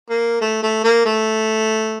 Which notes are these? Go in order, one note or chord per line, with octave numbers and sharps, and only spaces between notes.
A#3
A3
A3
A#3
A3